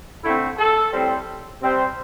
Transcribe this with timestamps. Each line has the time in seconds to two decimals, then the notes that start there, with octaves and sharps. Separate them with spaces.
0.24 D3 A3 C4 E4
0.58 A4
0.93 A2 G3 C4
1.61 C3 G3 C4